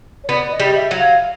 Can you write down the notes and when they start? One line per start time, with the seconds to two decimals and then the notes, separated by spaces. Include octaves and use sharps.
0.24 C#5
0.29 B3 D5
0.52 D#5
0.60 G3
0.75 E5
0.91 F#3
0.99 F5